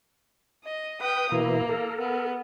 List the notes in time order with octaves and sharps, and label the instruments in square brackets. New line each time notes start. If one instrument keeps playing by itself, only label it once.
[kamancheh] D#5
[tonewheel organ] B4 [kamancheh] G5 D#6
[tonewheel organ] B2 E3 E4 [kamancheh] A#3
[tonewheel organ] A4 A#4
[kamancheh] B3